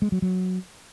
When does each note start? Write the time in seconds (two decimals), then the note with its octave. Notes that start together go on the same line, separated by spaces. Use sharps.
0.02 G#3
0.12 F#3
0.22 F#3